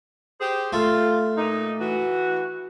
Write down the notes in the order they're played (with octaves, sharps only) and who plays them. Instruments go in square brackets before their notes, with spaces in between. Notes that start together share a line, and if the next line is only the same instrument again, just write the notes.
[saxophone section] G4 G#4 C5
[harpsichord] A3 [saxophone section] F4
[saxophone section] A#2 D#4
E3 F#4